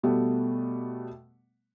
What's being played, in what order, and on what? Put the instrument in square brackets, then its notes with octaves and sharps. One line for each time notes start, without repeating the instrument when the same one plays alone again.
[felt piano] B2 G3 A3 B3